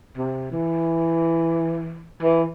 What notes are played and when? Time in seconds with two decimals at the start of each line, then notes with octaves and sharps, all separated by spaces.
0.17 C3
0.52 E3
2.23 E3